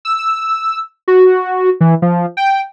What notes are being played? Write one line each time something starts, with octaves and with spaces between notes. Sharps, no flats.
E6
F#4
E3
F3
G5